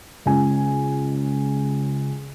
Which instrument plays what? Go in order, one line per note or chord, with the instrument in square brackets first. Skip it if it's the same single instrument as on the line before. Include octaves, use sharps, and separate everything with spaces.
[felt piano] C#2 C#3 G#5